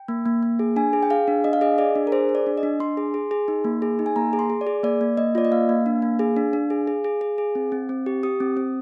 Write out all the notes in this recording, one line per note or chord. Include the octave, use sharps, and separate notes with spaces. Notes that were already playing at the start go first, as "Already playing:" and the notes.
Already playing: G5
A#3
A#3
A#3
G#4
D4 G#5
G#4
G5
G#4 F5
D4
D4 D#5
F5
G#4 D#5
G#4 D5
D4
A#4
G#4 C5
G#4
D5
D4
D#5
D4
D4 C6
G#4
G#4
G#4
D#4
A#3
G#4
D#4
G#5
A#3 A#5
G#4
C6
G#4
D5
G#4
A#3 D5
A#3
A#3 D#5
F4 D5
D#5
A#3 F5
A#3
D4
A#3
G#4
D4
D4
G#4
G#4
G#4
G#4
G#4
C4
C4
C4
G4
G4 D#6
C4
C4